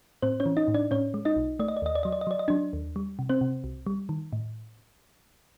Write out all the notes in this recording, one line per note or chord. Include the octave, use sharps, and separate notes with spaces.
A2 C4 C5
C#4 C#5
E3
D#4 D#5
A2
D4 D5
A2 C#4 C#5
G#3
D#4 D#5
B1
A3 D5
D#5
D5
D#2 D#5
D5
F#3 D#5
D5
D#5
F#3 D5
D#5
F#3 D4 D5
D#2
G3
C3
C4 C5
C3
C2
G3
D#3
A2